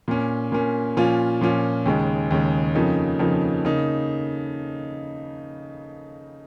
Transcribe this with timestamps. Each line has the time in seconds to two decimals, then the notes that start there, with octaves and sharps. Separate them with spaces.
0.08 A#2 A#3 C#4
0.52 A#2 A#3 C#4
0.97 A#2 F3 C#4 F4
1.41 A#2 F3 C#4 F4
1.86 D#2 C#3 G#3
2.31 D#2 C#3 G#3
2.75 F2 C#3 F3 A#3 D#4
3.19 F2 C#3 F3 A#3 D#4
3.65 C#3 A#3 D#4